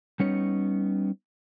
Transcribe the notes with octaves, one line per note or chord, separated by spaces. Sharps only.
G3 B3 C#4 D#4 C#5